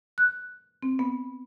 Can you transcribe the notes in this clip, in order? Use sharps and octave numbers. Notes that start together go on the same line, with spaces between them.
F#6
C4
B3